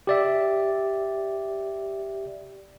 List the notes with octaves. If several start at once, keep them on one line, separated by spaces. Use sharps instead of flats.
G4 D5 E5